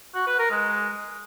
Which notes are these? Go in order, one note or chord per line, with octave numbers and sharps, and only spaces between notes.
F#4
B4
A#4
G#3